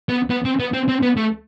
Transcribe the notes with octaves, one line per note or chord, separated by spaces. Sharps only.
B3
B3
C4
B3
C4
C4
B3
A3